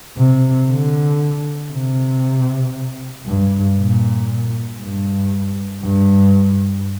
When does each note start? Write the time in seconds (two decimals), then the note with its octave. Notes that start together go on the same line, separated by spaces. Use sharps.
0.18 C3
0.70 D3
1.73 C3
3.26 G2
3.78 A#2
4.81 G2
5.83 G2